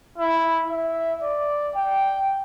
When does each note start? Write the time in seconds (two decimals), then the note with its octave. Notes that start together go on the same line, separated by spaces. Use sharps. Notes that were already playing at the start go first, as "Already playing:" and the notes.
0.18 E4
0.70 E5
1.23 D5
1.75 G5